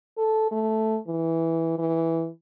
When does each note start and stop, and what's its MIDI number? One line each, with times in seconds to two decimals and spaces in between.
0.18 0.49 69
0.51 0.98 57
1.07 1.75 52
1.78 2.29 52